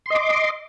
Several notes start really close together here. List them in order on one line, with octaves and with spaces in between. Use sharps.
C6 D#5 D6